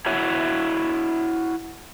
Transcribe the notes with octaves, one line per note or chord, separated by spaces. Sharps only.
E4 F#4 C#5 E5